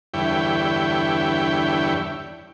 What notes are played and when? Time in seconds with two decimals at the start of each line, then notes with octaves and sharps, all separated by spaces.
0.14 E2 G2 D3 E4 C#5 G5